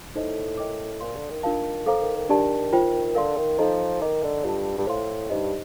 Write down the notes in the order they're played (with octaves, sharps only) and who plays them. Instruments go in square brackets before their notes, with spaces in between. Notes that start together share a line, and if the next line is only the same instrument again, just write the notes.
[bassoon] A2 [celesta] D#4 A4 C5 D#5
[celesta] A#4 D#5 G5 D6
[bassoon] A#2 [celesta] C5 F5 C6
[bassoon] D3
D#3
[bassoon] D#3 [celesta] D4 F4 A#4 F5 A5
[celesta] A4 C5 F5 A#5 D6
[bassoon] D#3
D#3
[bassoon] D#3 [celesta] D4 G4 D5 A5
[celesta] F4 C5 G5
[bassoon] D3 [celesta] A#4 F5 C6
[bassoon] D#3
[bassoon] F3 [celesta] D#4 A4 D#5 A#5
[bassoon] D#3 [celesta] A#4 D#5 A#5 D6
[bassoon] D3
[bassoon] G2 [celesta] F4 A4 D#5 A5
[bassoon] G2
[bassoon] A2 [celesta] C5 F5 C6
[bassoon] G2 [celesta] D#4 G4 C5 D#5